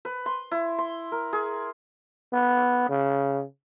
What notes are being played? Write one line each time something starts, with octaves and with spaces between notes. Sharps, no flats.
B4
C6
E4
C6
A#4
G#4
B3
C#3